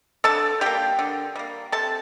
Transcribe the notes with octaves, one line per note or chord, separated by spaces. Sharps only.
D3 A4 A5
G3 A#3 G4 G5
D3
G3 A#3
C3 A4 A5